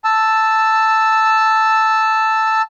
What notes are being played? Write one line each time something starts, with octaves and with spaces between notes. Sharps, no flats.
A5 E6